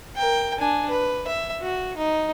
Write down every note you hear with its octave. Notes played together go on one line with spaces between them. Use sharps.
A#4 G5
D4 G#5
B4
E5
F#4
D#4